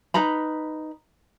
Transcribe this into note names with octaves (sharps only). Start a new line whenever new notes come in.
D#4 B4 A#5 B5